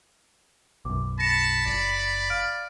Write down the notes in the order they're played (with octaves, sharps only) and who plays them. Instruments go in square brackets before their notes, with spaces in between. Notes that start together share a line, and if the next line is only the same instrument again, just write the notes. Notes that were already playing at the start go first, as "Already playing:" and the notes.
[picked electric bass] B1 F#2 [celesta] D6
[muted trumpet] A5 [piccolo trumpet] B5 [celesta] A#6 C#7 E7
[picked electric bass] F#1 [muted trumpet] D5
[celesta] F5 F6 D7